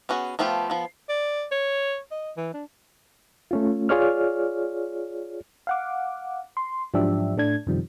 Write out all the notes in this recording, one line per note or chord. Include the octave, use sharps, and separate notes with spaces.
B3 C#4 F#4 G#4
F3 A3 B3 F4 G4
F3 B3
D5
C#5
D#5
E3
D4
A3 C#4 F4
F4 G#4 C#5 D5 F6
F5 F#5 D6
C6
G#2 F3 F#3 D4 G4 E5
A2 A3 D4 G#6
F#2 C3 D#3 F3 G3